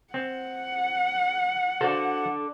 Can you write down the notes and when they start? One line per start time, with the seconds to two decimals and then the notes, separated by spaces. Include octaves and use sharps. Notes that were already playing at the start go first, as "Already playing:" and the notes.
0.14 C4 F#5
1.81 D4 F#4 A4 C5 F5